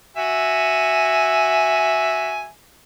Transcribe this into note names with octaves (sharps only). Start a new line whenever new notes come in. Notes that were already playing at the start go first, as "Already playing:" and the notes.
F#4 E5 G#5